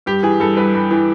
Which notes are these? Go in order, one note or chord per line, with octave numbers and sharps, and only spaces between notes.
G2 G4
E3 G#4
G2 A4
G2 B4
G2
E3